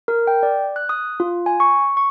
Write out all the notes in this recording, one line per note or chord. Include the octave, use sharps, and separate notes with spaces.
A#4
G5
D5
F#6
D#6
F4
G#5
C#6
C#6